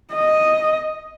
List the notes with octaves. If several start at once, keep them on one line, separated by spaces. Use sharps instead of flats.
D#5